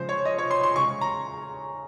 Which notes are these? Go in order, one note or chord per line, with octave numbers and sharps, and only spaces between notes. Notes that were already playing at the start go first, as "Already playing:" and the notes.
Already playing: C#3 F3 G#3 C5
C#5
D#5
C#5
C6
C6
C#3 G#3 C#6
A#5